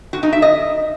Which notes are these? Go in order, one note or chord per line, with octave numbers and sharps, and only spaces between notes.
F#4
D#4
E5
D#5